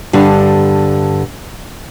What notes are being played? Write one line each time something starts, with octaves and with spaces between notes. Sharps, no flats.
G2 D3 G3